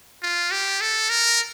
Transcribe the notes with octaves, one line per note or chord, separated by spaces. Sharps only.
F4
G4
A4
A#4